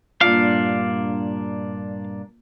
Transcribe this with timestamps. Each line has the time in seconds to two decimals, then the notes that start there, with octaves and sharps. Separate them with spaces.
0.21 G2 A#2 A#3 D4 F4 F5